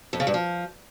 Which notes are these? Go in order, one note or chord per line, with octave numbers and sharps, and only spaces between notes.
F2
C#3
G2
F3